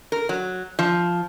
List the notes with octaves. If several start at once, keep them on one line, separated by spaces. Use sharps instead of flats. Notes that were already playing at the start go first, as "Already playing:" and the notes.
A#4
F#3
F3